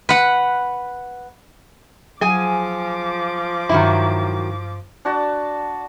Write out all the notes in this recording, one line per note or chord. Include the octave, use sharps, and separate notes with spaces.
B4 F#5
F3 F#3 G#4 G#5 D6
G2 D#3 F#3 E4
D4 F#4 A5